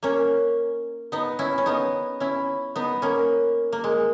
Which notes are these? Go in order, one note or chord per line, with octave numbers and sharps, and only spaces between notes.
A#3 C#4
B3 D#4
C#4 E4
C#4
B3 D#4
C#4 E4
B3 D#4
A#3 C#4
A#3
G#3